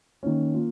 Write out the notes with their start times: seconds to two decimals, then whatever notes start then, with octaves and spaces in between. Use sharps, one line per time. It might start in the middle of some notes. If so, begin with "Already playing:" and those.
0.23 D#3 A#3 C#4
0.54 A#3 F4